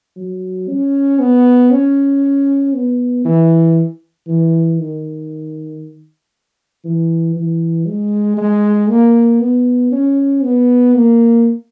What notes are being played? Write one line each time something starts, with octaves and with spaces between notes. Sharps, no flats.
F#3
C#4
B3
C#4
B3
E3
E3
D#3
E3
E3
G#3
G#3
A#3
B3
C#4
B3
A#3